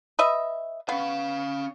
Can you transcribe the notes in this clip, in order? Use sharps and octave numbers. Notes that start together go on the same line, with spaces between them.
B4 D#5 E5
B3 C#4 F5